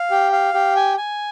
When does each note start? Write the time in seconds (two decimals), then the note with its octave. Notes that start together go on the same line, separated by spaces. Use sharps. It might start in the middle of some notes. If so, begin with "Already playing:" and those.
Already playing: F5
0.11 G4
0.32 F5
0.54 G4
0.76 G#5
0.97 G#5